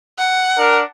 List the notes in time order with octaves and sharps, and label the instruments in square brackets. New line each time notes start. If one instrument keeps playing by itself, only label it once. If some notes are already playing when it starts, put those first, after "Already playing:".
[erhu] F#5
[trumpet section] D4 A#4